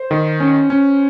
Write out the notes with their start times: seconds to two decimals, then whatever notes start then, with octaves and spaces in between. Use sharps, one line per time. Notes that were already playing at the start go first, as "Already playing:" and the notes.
Already playing: C5
0.11 D#3
0.40 C#4
0.70 C#4